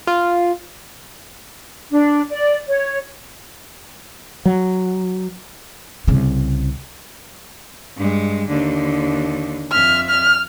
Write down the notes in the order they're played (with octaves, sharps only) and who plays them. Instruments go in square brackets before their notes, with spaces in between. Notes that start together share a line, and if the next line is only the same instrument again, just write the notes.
[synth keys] F4
[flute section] D4
D5
C#5
[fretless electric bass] F#3
[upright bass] C2 C#3
[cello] G2 G#3
D#2 D3
[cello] F2 E5 [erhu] F6
[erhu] F6